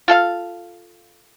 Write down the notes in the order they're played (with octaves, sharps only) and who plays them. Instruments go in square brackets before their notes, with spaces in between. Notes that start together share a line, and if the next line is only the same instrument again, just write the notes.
[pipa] F4 A4 F5